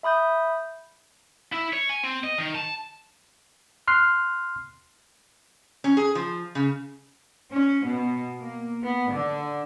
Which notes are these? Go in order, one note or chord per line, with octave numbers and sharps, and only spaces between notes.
E5 B5 D#6 G6
E4
C#5
G#5
C4
D#5
D#3
A5
C6 F6 F#6 C7
C#4
G#4
F3
C#3
C#4
B2
A#3
B3
D3